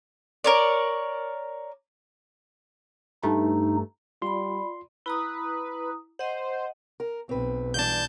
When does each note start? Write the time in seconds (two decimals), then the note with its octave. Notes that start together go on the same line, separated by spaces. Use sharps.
0.44 A#4 C#5 D5
3.23 G2 A3 D#4
4.22 G3 F4 D5 B5 C6
5.06 E4 B4 A#5 D#6
6.19 C5 D#5 F#5
7.00 A#4
7.29 B1 C4 B4
7.74 G2 E3 D4 A5 G6